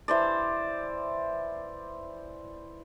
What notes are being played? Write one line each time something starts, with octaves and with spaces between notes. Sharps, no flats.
E3 C5 D5